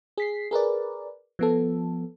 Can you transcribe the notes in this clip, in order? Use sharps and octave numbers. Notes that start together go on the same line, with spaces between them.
G#4 B6 C7
G#4 A#4 B4 D5
F3 B3 A4